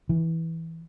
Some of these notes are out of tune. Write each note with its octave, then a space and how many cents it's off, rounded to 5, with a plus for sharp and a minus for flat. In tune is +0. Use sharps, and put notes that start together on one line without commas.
E3 -10